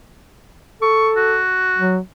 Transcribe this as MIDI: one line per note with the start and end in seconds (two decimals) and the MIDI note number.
0.82 1.40 69
0.82 1.10 85
1.17 1.97 66
1.78 1.99 54